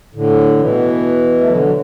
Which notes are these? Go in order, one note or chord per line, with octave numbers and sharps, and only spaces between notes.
A2 D3
B2 E3
A3
D3 F#3
F#3